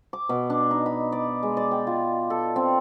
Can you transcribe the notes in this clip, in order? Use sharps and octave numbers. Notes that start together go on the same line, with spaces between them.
D6
B2
D4
D#4
B5
D5
G#3
D5
G5
F4
A4
C4